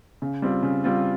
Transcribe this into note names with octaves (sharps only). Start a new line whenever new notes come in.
C#3
G3 C4 F4
C#3
G3 C4 F4